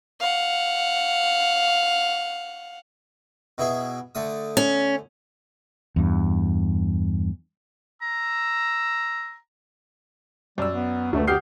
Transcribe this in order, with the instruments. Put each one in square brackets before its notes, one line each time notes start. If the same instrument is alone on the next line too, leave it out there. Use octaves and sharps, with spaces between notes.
[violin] F5 F#5
[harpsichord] B2 E4 G#4
D3 A3 D#6
[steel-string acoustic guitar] C#4
[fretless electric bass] E2 G2
[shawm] A#5 [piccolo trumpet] E6
[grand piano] F#2 E6 [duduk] G3 [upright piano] D5
[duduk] B3
[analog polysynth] D2 [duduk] A3 [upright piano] F#4 B4
[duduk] G4 [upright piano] F#5 D#6 F6 [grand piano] G6 C7